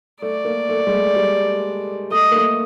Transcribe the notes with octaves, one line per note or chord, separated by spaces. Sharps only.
A3 D5
A#3
A3
G#3
A3
G3
A3 D#5
A#3
A3